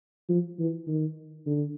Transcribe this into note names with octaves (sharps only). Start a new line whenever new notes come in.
F3
E3
D#3
D3